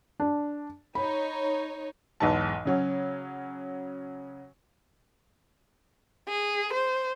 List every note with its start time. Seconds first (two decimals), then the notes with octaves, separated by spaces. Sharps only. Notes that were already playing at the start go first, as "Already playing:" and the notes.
0.20 D4
0.95 D#4 C#5 B5
2.20 B1 E2 G#2 B4 A5
2.65 C#3 F#3 C#4
6.28 G#4
6.73 C5